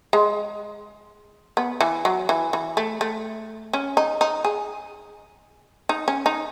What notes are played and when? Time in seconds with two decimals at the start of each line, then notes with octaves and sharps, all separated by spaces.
0.13 G#3
1.57 B3
1.81 E3
2.05 F#3
2.29 E3
2.53 E3
2.77 A3
3.01 A3
3.73 C#4
3.97 D#4
4.21 D#4
4.45 G#4
5.89 D#4
6.08 C#4
6.26 D#4